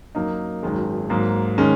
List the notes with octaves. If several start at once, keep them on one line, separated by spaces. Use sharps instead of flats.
F#2 F#3 A#3 D#4
G#1 F#2 D#3 G#3
G#2 F#3 A#3
D#3 G#3 C#4